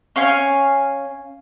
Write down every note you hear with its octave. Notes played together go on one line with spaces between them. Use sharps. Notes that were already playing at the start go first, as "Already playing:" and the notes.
C#4 F5 G#5 F6